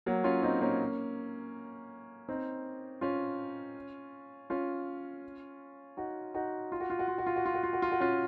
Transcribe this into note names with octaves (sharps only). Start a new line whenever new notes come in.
F#3 A#3
C#4 F4
C4 D#4
A#3 C#4
C4 D#4
C#4 F4
C#4 F4
D#4 F#4
D#4 F#4
F4
F#4
F4
F#4
F4
F#4
F4
F#4
F4
F#4
F4
F#4
F4
F#4
C#4 F4